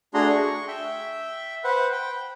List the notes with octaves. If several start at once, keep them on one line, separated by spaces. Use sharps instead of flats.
A3 D4 F#4 G#4 A#5 C6
C#6
E5 G5
B4 C5 F#5
G5